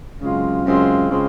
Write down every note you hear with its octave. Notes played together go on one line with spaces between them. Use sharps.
F#2 C#3 G#3 C4 F4
F#2 C#3 G#3 C4 F4
C#3 G#3 C4 F4